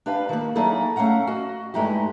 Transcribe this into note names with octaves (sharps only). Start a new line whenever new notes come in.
D4 G4 B4 F5
D#3 A#3
F#3 A#3 D#4 E4 G#4 A4
A3 C#4 F5 F#5 A#5
F#4 D#5
G2 G#3 A3 D#4 E4 G4